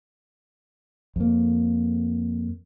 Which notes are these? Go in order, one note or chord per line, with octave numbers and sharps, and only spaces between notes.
F2 A#3